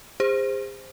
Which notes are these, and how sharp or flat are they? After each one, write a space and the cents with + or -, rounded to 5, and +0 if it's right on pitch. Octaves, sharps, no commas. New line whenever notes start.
G#4 -40 C5 +0